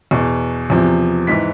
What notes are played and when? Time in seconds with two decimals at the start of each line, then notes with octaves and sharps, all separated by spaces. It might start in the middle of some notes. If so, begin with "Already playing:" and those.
0.11 E2 B2
0.70 E2 C3 F3
1.27 G#2 E3 B6